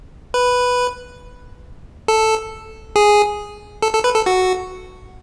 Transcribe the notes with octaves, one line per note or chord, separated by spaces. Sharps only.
B4
A4
G#4
A4
A4
B4
A4
F#4